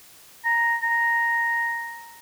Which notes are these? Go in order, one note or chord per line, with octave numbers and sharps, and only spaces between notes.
A#5
A#5